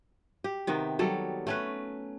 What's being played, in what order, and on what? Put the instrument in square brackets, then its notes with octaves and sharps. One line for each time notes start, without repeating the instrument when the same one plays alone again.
[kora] G4
C3 D#3 B3
F#3 G3 A4
A3 C#4 B4